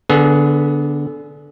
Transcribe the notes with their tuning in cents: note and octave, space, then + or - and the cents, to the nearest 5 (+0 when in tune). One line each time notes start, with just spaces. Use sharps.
D3 -10 B3 +0 G#4 +25